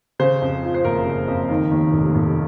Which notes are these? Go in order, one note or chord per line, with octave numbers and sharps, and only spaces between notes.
C#3 C5
F2
F3
C5
F#1 A#4
C#3
F2
D#3
D#2
F1
F1